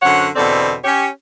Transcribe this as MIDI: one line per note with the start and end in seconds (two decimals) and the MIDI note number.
0.02 0.27 42
0.02 0.27 50
0.02 0.27 72
0.02 0.27 73
0.02 0.27 78
0.36 0.73 40
0.36 0.73 47
0.36 0.73 50
0.36 0.73 60
0.36 0.73 69
0.36 0.73 74
0.84 1.06 61
0.84 1.06 67
0.84 1.06 73